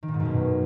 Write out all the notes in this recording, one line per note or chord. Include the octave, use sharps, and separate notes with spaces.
D#3
A#2
G#2
F#2
B2